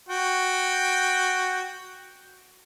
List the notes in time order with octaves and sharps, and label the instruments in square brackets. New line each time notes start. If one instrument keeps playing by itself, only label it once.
[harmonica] F#4 G5